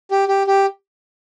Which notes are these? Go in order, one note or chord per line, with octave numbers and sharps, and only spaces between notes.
G4
G4
G4